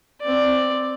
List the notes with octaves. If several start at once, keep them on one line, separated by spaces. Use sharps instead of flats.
C4 D5